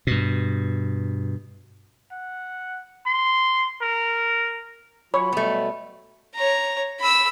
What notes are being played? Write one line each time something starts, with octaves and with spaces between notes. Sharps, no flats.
G2 B2
F#5
C6
A#4
F#3 F4 C#5 B5
B2 F#3 G3 A3 B3
C#5 A#5
B5 E6